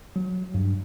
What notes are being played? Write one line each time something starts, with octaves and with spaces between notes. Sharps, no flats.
F#3
G2